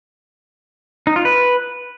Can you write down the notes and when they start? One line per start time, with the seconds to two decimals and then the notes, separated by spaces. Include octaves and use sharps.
1.07 D#4
1.16 F4
1.25 B4